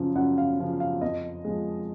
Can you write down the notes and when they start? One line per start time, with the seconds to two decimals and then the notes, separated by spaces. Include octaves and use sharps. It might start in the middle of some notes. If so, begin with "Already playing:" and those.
Already playing: F#2 C#3 F3
0.15 F#2 F#5
0.38 F5
0.59 C#3 F3
0.80 F5
1.01 F2 D#5
1.45 F3 G#3